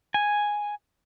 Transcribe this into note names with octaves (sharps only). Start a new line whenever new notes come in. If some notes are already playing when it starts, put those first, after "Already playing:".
G#5